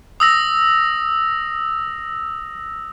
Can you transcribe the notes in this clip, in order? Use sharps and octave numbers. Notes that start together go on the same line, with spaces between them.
D#6 E6 A#6